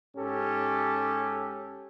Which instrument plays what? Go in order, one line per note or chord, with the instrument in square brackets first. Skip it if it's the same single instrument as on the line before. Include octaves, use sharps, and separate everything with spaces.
[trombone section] G#2 C#4 G4 A4